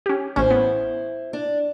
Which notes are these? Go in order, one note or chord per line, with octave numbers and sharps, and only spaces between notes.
C#4 G4
A1 C#4 E4 C5
B3
D4